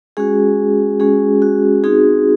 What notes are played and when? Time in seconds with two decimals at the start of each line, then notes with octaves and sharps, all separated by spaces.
0.17 G#3 C#4 F#4 G#4
1.00 G#3 C#4 F#4 G#4
1.42 F#4
1.84 C4 D#4 F#4 G#4